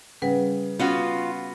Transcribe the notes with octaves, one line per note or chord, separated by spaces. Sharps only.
C#3 G3 B4 F#5
B3 C#4 F4 F#4